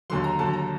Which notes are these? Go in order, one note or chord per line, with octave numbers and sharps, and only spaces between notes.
D#2 D3 F#3 C6
A#5
D#2 D3 F#3 A5
A#5